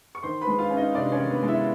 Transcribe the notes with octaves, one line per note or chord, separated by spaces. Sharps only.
C#6
D#3 C5 C6
B4 B5
G#3
F4 F5
C#4
D#4 D#5
C3 D4 D5
C#4 C#5
D#3
B3 B4
G#3
E4 E5